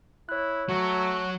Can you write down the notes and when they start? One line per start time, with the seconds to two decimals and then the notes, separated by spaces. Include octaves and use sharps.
0.29 E4 C#5 F#6
0.69 F#3 A3 F#4